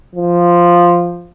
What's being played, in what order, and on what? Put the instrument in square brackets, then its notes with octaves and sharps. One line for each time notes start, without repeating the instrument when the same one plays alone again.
[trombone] F3